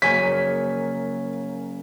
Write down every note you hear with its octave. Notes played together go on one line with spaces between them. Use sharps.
F#1 F#3 A#3 C#5 G#5 B6